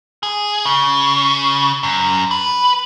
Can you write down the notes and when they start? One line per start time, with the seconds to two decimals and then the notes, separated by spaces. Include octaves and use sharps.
0.23 G#4
0.66 C#3
1.83 F#2
2.31 B4